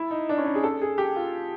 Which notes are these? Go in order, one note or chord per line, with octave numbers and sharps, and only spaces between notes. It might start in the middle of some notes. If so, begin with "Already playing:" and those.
Already playing: E4
D#4
D4
C#4
D#4
G#4
A4
G#4
G4
F4